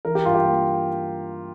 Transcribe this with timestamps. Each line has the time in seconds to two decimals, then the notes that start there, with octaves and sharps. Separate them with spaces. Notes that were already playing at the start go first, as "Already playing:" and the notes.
0.05 E3 A#4
0.15 G4
0.25 G2 F4
0.35 G4
0.45 A#3